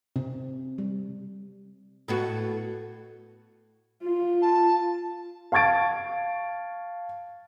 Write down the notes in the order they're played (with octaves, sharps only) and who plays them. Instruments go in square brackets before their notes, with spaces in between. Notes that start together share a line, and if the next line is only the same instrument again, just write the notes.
[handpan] C3
G3
[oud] A2 B3 F#4
[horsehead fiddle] F4
[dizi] A5
[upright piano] F5 A5 C#6 G#6 A6 D7